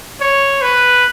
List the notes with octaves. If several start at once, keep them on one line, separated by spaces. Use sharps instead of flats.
C#5
B4